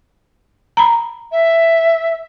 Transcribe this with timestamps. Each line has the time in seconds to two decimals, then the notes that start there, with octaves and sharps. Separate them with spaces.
0.77 A#5 B5
1.32 E5